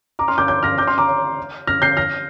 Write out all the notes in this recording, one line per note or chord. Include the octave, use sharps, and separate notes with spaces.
A#5 D6
C6 F6
D6 G6
D6 G6
F6 A#6
D6 G6
C6 F6
A#5 D6
F6 A#6
G6 C7
F6 A#6